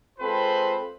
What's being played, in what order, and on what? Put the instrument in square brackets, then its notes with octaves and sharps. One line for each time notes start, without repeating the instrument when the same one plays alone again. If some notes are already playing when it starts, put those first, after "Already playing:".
[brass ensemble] G#3 C4 F4 A4 B4 C5